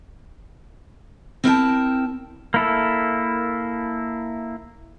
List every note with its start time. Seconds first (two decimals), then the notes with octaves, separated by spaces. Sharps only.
1.44 C4 E4 A#4 F5 G5 A5
2.54 A#3 E4 A4